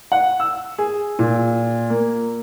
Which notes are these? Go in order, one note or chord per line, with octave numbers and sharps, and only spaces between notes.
F#5
E6
G#4
A#2
A#3